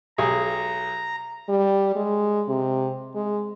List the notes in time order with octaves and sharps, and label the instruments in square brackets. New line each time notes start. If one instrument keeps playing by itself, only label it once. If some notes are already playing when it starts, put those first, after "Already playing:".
[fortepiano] B1 G4 G#4 [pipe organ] A#5
[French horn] G3
G#3
C3
G#3